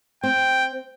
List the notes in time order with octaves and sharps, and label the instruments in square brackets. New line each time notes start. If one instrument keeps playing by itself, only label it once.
[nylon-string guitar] C4 [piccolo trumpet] G5